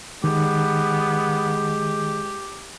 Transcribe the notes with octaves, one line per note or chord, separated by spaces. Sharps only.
D#3 G#3 B3 G4